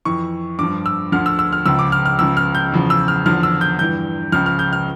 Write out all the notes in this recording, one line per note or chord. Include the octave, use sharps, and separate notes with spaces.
F2 E3 C#6
G2 F3 D6
E6
D2 D3 F3 F6
E6
E6
F6
C#2 C#3 F3 E6
D6
F6
F6
C#2 C#3 F3 E6
F6
G6
E2 C#3 F3
E6
F6
E2 D3 F3 F6
E6
G6
G2 E3 G6
C#2 C#3 F3 F6
F6
G6
F6